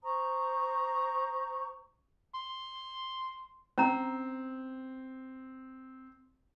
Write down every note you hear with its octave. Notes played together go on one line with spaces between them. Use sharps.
C5 A#5 C#6 D#6
C6
C4 C#4 A#5